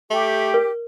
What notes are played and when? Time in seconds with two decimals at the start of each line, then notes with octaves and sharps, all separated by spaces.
0.11 A3 G4
0.54 A#4